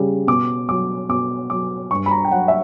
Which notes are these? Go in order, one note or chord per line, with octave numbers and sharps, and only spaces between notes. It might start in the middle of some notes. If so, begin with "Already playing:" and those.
Already playing: C#3 G3
B2 D6
F#3 D6
B2 D6
F#3 D6
G2 C#6
B5
A#5
G5
F#3 F#5
E5